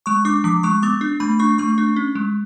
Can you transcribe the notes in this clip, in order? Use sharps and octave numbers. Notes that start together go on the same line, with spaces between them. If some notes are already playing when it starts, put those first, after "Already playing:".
G#3 C#6
D4 D6
F3 D6
G#3 C#6
B3 D6
D4
A3 B5
D4 C#6
A3 C#6
D4
C#4
G#3